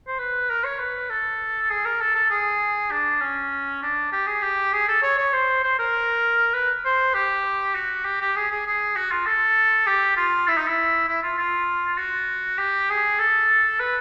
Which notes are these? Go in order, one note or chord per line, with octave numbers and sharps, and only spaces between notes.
C5
B4
A#4
C#5
B4
A4
G#4
A#4
A4
A4
G#4
D4
C#4
D4
G4
G#4
G4
G#4
A4
C#5
C#5
C5
C5
A#4
B4
C5
G4
F#4
G4
G4
G#4
G#4
G#4
F#4
F4
A4
G4
F4
E4
D#4
E4
E4
F4
F4
F#4
G4
G#4
A4
B4